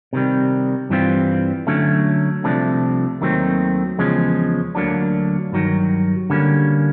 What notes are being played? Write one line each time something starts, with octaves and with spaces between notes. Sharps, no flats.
C3 D#3 G3
G2 E3 G3 C4 F4
D3 F#3 A3 C#4
C2 C3 F3 A3 D4
D#2 D#3 F#3 A3 C4
E2 C#3 F3 G#3 C#4
D2 D3 F#3 A#3 D4
G2 D#3 F#3
D3 G3 A#3 C#4